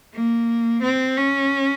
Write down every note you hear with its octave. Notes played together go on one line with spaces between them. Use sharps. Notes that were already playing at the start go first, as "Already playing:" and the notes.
A#3
C4
C#4